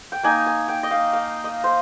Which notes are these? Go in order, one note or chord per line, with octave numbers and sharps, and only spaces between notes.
G5
A#3 D#4 G#5
G#5
G5
D#5
F5
F5
D#5
C5